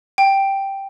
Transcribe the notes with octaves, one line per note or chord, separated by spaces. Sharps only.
G5